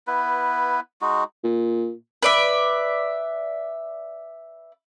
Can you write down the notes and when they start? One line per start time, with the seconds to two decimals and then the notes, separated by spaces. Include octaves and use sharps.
0.07 B3 E4 B4
1.01 G#3 D#4 F#4
1.44 A#2
2.22 B4 D5 E5